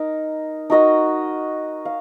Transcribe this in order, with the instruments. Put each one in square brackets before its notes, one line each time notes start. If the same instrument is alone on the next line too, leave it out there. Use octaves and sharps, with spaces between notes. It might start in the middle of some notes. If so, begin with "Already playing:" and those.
Already playing: [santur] D#4 A#4
D#4 F#4 A#4 D#5
F5